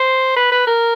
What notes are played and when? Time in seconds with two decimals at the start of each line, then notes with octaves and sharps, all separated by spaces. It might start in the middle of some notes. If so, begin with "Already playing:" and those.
Already playing: C5
0.36 B4
0.52 B4
0.67 A#4